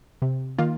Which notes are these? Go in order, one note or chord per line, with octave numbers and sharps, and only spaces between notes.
C3
D#3 A#3 F4